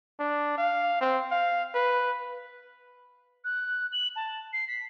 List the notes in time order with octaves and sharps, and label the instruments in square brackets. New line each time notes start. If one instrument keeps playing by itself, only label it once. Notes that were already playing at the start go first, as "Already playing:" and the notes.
[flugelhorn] D4
F5
C4
F5
B4
[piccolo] F#6
F#7
A5
C7
B6